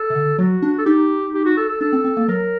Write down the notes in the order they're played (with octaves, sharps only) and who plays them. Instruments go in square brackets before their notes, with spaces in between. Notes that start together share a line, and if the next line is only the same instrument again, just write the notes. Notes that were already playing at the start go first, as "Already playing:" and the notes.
Already playing: [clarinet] A4
[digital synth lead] C3
D3
[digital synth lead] F#3 [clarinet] F#4
[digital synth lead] D4
[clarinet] A4
[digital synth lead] D#4 [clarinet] G4
[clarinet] G4
F#4
A4
A4
[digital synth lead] D4 [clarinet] A4
[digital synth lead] C4
C4
A#3
[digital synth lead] F#3 [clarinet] A#4